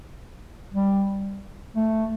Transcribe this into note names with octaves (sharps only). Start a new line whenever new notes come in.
G3
A3